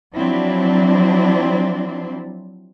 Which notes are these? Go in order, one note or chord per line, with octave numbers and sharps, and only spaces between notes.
F3 F#3 C4 D4 E4